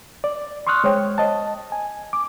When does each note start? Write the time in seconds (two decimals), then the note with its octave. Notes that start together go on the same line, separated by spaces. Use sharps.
0.24 D5
0.67 C6 C#6 D#6 F6 F#6
0.84 G#3 C5 C#5 G5
1.18 D#5 A5
1.72 G#5
2.13 D6